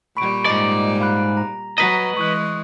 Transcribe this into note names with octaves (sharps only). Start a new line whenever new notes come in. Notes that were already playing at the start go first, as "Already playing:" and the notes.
A#2 G3 B5 C#6 D7
G#2 D5 D#5
F5 B5 F#6
A#5
F#3 B4 D#5 A#5 D#6
E3 G#3 C#6 D#6 F#6